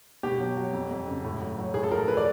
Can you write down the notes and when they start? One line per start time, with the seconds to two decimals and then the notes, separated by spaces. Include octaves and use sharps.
0.23 B2 G4
0.40 F#3
0.57 F#3
0.73 F2
0.91 F2
1.07 C#3
1.24 A2
1.41 F#3
1.58 F#3
1.74 A2 G#4
1.83 A4
1.91 F3 A#4
2.08 F3 B4
2.17 D5